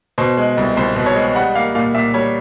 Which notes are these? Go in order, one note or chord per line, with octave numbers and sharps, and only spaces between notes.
B2 C5
G#3
C2
C2 C5
B2
C#5
G#3
G3 F#5
A#3 F5
A#2 F5
A#2 E5
G3 C#5